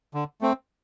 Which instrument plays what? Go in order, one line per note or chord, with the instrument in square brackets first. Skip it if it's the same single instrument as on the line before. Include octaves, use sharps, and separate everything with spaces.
[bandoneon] D3
A3 C4